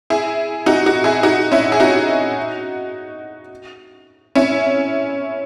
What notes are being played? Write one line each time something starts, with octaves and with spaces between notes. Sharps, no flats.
E4 G#4
D#4 F#4
D#4 F#4
E4 G#4
D#4 F#4
C#4 E4
G#4
D#4 F#4
C#4 E4